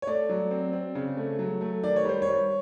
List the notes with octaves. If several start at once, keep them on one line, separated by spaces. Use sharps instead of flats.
C#5
A3 D5
F#3
C4
C4
C#3
A3
F#3
A3
D#3 D5
C#5
G3 C5
C#5
G3